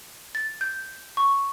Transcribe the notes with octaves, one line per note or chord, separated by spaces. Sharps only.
A6
G6
C#6